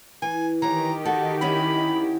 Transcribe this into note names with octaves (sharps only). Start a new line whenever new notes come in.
E3 G#5
D#3 E3 G4 C#5 A#5
F#4 A4
C#4 E4 F#4 B5